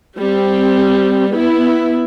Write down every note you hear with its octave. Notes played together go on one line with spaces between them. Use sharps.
G3 C4
B3 E4